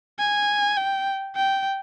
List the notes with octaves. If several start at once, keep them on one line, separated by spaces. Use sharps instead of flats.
G#5
G5
G5